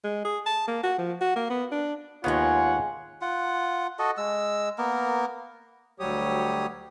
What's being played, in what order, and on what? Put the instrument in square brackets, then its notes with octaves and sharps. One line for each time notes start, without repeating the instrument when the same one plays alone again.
[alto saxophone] G#3
G#4
A5
A#3
F#4
F3
F#4
A#3
B3
D4
[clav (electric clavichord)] D#2 B3 [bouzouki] C#3 E3 G#3 [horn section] F4 C#5 F#5
[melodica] F4 F#5
F#4 A4 D#5
G#3 E6
A#3 B3 A#4
[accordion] D2 F#3 G3 G4 C#5 D#6